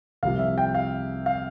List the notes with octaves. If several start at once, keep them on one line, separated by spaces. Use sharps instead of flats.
C2 C3 F3 F5
E5
G5
F5
F5